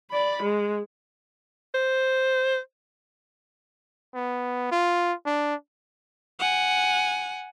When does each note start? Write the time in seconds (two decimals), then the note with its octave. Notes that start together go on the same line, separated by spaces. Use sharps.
0.10 D5 B5
0.43 G#3
1.74 C5
4.14 B3
4.72 F4
5.26 D4
6.39 F#5 G#5